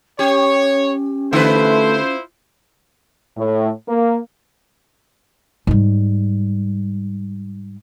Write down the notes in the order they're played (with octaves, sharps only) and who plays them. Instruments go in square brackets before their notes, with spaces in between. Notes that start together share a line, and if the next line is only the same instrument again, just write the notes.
[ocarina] C#4 [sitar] G4 [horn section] C#5
[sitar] D3 B4 [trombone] A3 [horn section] E4 F4 C5
[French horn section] A2
A#3
[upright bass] G#2 G3